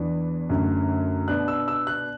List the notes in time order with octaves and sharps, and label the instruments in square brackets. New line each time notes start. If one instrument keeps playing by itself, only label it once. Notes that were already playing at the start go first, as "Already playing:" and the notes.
Already playing: [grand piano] E2 E3 B3 D4
F#2 D3 A3
B2 B3 D4 F#6
E6
E6
F#6